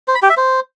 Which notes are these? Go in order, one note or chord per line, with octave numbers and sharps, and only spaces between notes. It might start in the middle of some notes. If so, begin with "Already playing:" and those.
C5
B5
G4
E5
C5